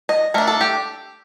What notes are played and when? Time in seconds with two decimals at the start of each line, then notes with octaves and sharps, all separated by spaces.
0.09 D#5
0.34 A3 D4 A#4
0.48 A4
0.61 G4